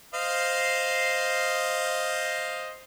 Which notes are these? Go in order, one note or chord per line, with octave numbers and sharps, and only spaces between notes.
C5 D#5 F5